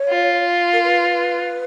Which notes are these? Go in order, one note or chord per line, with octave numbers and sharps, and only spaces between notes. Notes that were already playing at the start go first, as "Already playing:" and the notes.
Already playing: C#5
F4
A#4
B4